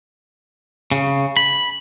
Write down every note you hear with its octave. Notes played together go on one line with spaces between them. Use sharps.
C#3
B5